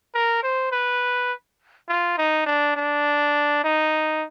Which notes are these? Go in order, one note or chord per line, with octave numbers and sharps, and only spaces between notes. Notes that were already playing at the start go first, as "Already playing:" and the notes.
A#4
C5
B4
F4
D#4
D4
D4
D#4